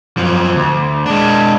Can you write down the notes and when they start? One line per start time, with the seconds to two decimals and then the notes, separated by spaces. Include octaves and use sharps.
0.17 F#2 F3
0.56 D2
1.06 G#3 D4